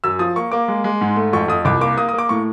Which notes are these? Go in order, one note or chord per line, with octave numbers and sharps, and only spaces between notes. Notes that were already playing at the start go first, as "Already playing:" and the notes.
F#2 E6
F3 D#6
A#3 C#6
A#3 D6
G#3
G#3
G#2
A3
F2 C#6
F2 D#6
C2 D6
A#3 D6
A#3 D#6
D#6
A#3 D6
A2 C#6